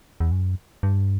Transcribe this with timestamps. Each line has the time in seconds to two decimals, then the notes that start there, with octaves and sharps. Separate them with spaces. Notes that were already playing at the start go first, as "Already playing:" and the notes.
0.20 E2
0.32 F#2
0.83 G2